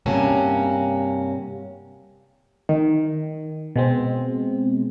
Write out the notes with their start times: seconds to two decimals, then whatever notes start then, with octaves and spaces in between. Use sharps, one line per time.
0.06 G2 C3 A#3 C#4 F#4 A5
2.69 D#3
3.76 B2 G#3 C4